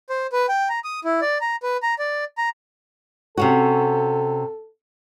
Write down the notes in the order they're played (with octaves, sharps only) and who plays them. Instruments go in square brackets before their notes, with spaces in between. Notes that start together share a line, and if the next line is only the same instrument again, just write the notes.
[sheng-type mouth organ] C5
B4
G5
A#5
D#6
E4
D5
A#5
B4
A#5
D5
A#5
[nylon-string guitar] C3 C#4 F#4 [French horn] A4